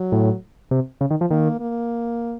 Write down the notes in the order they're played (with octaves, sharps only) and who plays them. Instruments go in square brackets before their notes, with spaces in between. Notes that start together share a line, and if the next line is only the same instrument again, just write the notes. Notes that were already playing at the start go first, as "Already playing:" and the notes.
Already playing: [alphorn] F#3
[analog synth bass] A2
C3
C#3
D#3
F3
[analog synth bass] D#3 [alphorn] A#3
[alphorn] A#3